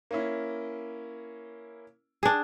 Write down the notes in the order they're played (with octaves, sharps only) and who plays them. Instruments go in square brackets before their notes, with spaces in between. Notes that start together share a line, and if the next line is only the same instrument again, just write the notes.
[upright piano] A#3 C#4 E4
[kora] D4 G#4